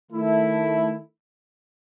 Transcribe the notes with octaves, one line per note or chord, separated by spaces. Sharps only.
D#3 A3 E4